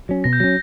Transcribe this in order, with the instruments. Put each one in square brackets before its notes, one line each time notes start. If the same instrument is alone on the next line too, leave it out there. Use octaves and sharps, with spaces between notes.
[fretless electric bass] F#3 C#4
[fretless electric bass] B2 [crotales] A#6
[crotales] G6
[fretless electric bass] F#3 C#4 [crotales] A#6